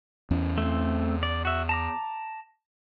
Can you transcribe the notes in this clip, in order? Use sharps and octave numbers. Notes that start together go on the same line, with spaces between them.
E2 C#4
A3 C4
D5
F#4 E5
A5 A#5 D6